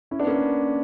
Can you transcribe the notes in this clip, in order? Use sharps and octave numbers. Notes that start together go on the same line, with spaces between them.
C#4 E4
B3 D4
A#3 C#4